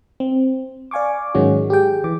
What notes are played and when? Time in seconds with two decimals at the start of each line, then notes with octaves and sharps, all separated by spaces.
0.20 C4
0.91 D5 F5 G#5 C#6 D6
1.35 G#2 D#3 F#3 G#3 C#4 F#4
1.70 G4 G#4 G5
2.04 E3 D6